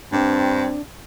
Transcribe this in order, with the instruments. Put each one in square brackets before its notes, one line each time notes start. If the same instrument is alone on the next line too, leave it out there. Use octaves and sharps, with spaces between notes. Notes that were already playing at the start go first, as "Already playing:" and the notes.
[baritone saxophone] G2 [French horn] C4 [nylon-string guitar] D4 F#5